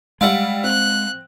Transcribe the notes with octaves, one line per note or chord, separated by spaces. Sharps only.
G3 G#3 F5 F#5 E6 D7
C4 F#6